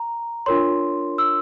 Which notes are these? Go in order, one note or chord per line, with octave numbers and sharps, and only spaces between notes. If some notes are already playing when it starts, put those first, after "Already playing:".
Already playing: A#5
D4 F4 A#4 C#5 C6
E6